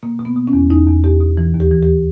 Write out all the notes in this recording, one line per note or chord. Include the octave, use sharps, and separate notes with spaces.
B2 A#3
B2
B3
B2
C#4
E2
E2 D#4
E2
E2 G4
B2
E3
D#2
G4
E3
G4